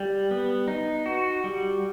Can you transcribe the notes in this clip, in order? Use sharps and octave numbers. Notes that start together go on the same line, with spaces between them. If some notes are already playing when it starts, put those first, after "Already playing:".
Already playing: G3
B3
D#4
F#4
G3